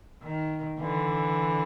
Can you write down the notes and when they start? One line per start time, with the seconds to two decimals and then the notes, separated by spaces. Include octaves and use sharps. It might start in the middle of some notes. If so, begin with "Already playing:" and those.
0.23 D#3
0.79 D3 E3